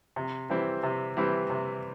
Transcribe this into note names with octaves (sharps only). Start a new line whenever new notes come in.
C3
E3 G3 C4 E4
C3
E3 G3 C4 E4
C3